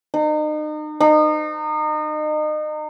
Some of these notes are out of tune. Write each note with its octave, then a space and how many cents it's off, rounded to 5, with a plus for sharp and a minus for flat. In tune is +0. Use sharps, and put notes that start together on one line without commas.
D#4 -35
D#4 -30